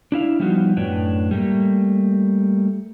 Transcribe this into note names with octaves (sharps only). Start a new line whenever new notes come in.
D4 E4 F5
F3 G3 B3 D#4 F4 F#4
F#2 A2 D4 B4 C#5 G5
G3 A3 A#3